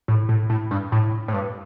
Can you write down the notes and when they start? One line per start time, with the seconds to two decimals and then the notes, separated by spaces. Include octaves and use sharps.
0.08 A2
0.29 A2
0.50 A2
0.71 G2
0.92 A2
1.28 A2
1.33 G2